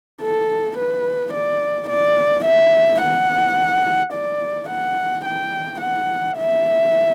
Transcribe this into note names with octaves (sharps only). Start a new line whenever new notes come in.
A4
B4
D5
D5
E5
F#5
D5
F#5
G5
F#5
E5